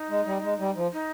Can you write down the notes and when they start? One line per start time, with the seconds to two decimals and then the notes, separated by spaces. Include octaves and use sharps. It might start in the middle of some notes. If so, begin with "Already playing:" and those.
Already playing: D#4
0.09 G#3
0.26 G3
0.42 G#3
0.59 G3
0.76 F3
0.93 D#4